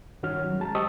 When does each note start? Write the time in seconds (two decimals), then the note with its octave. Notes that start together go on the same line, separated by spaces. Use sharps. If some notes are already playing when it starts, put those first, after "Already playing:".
0.23 G2 D#3 C#4 F#4 C#5 F6
0.45 F#3
0.60 G#3 A5 A#5
0.75 G4 C5 D#5 C#6 D#6 E6